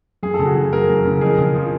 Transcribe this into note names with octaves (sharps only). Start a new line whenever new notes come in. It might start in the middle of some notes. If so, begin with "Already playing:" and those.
F#2 G#4
C#3 A4
F#4 G#4
E3
F#2 G#4 A#4
F#2
C#3
F2 G#4 A#4
C#3
F3